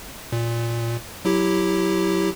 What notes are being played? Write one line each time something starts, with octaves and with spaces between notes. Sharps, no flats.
A#2
F#3 E4 G4